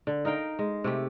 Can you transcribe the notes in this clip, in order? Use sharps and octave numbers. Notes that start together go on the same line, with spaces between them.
D3
D#4 A#4 F5 G5
G#3
C3 A3 G4